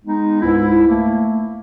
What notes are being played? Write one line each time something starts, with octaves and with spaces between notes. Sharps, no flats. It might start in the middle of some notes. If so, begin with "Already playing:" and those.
G#3 B3 D#4
C#2 G#2 E4
A3 A#3